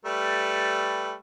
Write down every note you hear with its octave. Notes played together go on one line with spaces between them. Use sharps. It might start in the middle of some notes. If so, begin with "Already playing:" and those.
G3 A3 B4